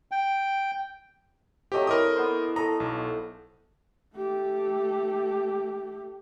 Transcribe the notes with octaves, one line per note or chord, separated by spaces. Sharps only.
G5
F#3 A3 C4 G4 D#5
E4 A#4 D5 D#5 C6 D#6
B3 C5
A4 D#5 A#5
B1
A3 G4